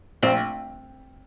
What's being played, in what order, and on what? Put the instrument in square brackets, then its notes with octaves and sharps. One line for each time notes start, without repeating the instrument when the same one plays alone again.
[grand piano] A#1 [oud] C4